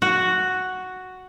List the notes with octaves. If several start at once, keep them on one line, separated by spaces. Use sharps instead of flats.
F#4